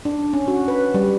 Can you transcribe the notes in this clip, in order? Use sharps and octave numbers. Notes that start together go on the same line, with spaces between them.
D4
C#4
F#4
B4
G3